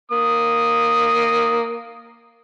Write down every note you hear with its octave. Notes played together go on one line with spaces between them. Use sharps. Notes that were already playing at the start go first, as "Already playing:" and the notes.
A#3 D#6